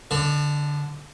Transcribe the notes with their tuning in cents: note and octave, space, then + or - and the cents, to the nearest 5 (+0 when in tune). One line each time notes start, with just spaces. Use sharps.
D3 -10 D5 +40